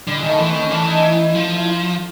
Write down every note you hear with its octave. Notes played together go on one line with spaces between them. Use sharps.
D3 G3
G#3
D#3 A3
E3 B3
C4
D#3
C#4
E3 D4
D#4
E4
E4
F3
E4
F4